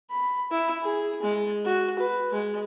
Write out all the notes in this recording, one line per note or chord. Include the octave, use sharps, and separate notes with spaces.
B5
E4
G#4
G#3
F#4
B4
G#3